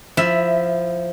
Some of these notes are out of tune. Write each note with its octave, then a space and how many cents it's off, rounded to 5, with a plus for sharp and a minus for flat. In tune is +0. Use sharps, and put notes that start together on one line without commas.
F3 +0 E4 +15 E5 +0